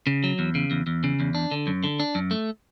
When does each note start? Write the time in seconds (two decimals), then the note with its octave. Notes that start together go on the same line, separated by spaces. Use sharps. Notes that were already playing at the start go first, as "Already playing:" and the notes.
0.07 C#3
0.24 F#3
0.39 E2
0.55 C#3
0.71 E2
0.87 E2
1.04 C#3
1.20 E2
1.35 D4
1.51 D3
1.67 F#2
1.84 D3
2.00 D4
2.15 F#2
2.31 A3